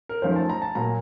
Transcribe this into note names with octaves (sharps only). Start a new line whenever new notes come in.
A#4
F#2 F3 A3 D#4 C5
A5
A#5
A5
A#2 F#3 A#3 A#5